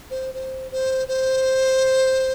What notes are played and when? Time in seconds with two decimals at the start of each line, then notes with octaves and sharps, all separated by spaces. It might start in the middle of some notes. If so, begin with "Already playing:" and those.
0.10 C5
0.34 C5
0.71 C5
1.08 C5